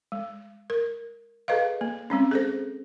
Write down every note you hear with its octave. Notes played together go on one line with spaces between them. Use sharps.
G#3
A#4
G#4 A4 B4 D#5 F5
A#3
G#3 C4 C#4
G#4 A4 C5